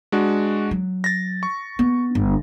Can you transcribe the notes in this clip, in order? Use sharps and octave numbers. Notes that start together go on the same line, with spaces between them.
G#3 D4 F#4
F#3
A6 A#6
C#6
B3
G1